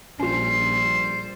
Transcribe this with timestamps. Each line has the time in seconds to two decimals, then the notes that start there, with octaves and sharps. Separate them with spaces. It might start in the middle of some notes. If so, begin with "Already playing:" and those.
0.20 A#1 G3 C#4 F4 C5